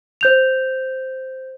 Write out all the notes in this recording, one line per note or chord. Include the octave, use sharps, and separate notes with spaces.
C5 G6 F7